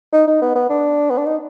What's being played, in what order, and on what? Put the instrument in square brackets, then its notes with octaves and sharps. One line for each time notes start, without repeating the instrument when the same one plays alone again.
[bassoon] D#4
D#4
B3
B3
D4
B3
D4
D#4